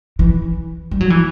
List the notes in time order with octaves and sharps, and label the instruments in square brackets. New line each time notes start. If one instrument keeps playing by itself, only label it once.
[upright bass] E3
G3
F#3
E3